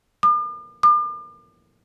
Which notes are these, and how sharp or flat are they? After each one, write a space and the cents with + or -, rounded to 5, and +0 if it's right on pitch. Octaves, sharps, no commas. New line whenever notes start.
D6 +45
D6 +40